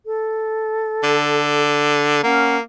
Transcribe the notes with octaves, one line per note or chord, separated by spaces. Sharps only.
A4
D3
A#3 C#4 F#5 F6